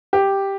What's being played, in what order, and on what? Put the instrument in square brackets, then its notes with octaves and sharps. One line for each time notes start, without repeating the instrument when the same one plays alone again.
[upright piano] G4